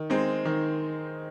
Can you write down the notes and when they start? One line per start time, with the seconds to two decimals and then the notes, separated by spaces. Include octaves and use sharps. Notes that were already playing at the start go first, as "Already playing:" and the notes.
Already playing: D#3
0.10 G#3 C4 D#4
0.45 D#3